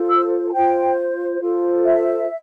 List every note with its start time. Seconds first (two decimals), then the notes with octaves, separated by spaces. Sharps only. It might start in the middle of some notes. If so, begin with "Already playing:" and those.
Already playing: F4 A4 C5
0.09 E6
0.48 A5
0.52 F4 C5 G5
1.40 F4 A4 C5
1.84 E5